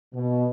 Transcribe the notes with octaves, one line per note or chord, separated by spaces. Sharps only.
B2